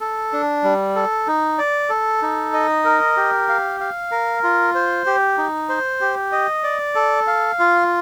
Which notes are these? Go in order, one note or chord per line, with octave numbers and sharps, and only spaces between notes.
A4
D4
G3
A4
D#4
D5
A4
D#4
D#5
A#4
G4
F5
F5
A#4
F4
C5
G4
D#4
C5
G4
D#5
D5
A4
F5
F4